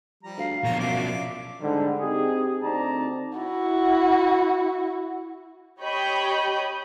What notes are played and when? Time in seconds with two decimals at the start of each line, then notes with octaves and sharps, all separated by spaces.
0.23 F3 G3 A#5
0.38 D2 F5
0.64 A#1 B2 F3 A#5
0.80 F#2 D5 E5 D6
1.62 G#2 D3 G3
2.00 C4 D#4 G4 G#4
2.62 D2 C4 D#4 D5 A5 A#5
3.38 E4 F#4
5.82 G4 C#5 D#5 B5 G6